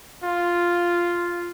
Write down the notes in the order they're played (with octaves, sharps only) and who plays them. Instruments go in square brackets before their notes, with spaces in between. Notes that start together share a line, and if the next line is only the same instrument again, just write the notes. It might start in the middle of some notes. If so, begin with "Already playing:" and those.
[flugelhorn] F4